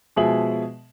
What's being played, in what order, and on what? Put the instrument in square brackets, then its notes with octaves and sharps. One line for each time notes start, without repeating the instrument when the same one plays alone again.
[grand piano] B2 F3 G#3 G#4 E5 F#7